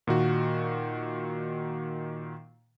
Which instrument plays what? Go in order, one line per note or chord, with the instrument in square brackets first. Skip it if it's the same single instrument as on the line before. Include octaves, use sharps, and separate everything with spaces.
[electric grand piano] A#2 D#3 F#4